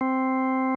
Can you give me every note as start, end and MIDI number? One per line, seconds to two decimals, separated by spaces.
0.01 0.75 60